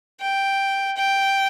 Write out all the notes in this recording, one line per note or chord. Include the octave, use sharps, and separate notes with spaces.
G5
G5